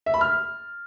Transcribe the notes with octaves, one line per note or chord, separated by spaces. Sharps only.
E5
B5
F6